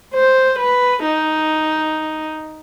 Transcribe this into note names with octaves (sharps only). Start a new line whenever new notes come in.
C5
B4
D#4